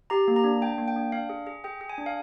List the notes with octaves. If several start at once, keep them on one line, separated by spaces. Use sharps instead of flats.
G4 A#5
A#3
A#5
D4
D4 G5
A#3
G5
D4
D4 F5
G#4
G#4
G#4 G5
G#4
G#5
D4
F5